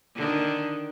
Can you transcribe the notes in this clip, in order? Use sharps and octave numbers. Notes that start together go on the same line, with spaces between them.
D3 D#3